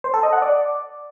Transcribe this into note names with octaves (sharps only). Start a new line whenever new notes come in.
C5
A4
D#5
F#5
D5